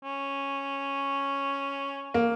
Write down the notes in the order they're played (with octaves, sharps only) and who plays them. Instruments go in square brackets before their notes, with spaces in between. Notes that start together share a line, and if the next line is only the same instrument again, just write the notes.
[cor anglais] C#4
[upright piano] A#3